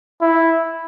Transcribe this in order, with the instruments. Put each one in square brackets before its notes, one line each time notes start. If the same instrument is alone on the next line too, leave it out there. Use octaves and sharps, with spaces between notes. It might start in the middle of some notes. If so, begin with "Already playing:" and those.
[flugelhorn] E4